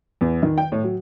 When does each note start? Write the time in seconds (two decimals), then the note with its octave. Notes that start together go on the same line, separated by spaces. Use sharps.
0.21 E2
0.42 D#3
0.58 G5
0.72 A2
0.84 F#3